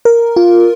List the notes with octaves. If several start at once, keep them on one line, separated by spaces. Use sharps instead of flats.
A#4
F4